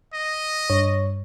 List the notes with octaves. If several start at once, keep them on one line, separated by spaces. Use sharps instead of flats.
D#5
G2 C#5